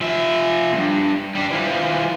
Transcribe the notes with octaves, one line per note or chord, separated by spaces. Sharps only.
F3 E5
E2 G2
G3 D4
E3 F3